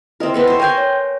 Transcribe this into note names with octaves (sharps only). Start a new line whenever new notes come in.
C4 E4 A#4 D#5
B3 C4 A4
C5 C#5
A#4 G5 G#5 C6 G6
C#5